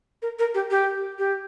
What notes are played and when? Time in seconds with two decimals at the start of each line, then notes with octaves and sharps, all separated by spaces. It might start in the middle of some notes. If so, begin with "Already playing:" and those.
0.22 A#4
0.39 A#4
0.54 G4
0.71 G4
1.18 G4